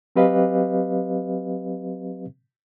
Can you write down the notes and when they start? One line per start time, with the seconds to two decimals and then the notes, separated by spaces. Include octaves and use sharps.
0.16 F#3 C4 G4 B4 D#5 F5